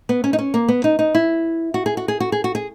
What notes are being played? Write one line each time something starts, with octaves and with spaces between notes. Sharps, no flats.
B3
C#4
D#4
C#4
A#3
B3
D#4
D#4
E4
F#4
G#4
F#4
G#4
F#4
G#4
F#4
G#4